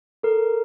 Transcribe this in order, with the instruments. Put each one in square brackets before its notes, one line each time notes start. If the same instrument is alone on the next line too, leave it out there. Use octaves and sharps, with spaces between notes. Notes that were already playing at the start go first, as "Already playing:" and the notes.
[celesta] A4 [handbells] A#4